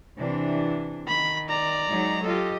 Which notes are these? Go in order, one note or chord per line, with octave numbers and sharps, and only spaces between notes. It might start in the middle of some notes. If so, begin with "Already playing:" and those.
C3 E3 D4
D#3 B5
D5 A#5
F#3 G#3 D#4
F4 G4 A4 D#5